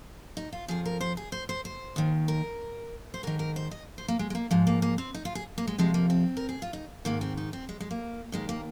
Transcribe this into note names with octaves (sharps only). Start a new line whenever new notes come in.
D#4
F4
F2 F3 G#4
A#4
C5
G#4
C5
C5
C5
D#2 D#3
A#4
C5
G#2 D#3 A#4
A#4
C5
D#5
C5
A#3
G#3
G#3
A#3
G#2 F3 G#3
A#3
A#3
C4
D#4
F4
G#4
A#3
G#3
F2 C3 F3 G#3
A#3
C4
A#4
G#4
F4
D#4
G#2 D#3 A#3
C4
D#4
C4
G#3
G#3
A#3
D#2 D#3 G#3
A#3